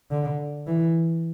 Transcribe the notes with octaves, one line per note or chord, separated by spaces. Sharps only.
D3
E3